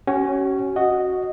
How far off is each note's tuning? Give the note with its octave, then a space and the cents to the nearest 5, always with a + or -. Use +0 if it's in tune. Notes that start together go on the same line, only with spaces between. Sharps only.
C#4 +0 F#4 +40
F#4 +0 D#5 +0